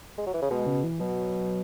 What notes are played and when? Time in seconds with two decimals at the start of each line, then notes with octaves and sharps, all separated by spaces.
0.18 G#3
0.26 F#3
0.34 E3
0.42 C#3
0.50 B2 G#3
0.66 C#3
0.84 E3
0.99 B2 F#3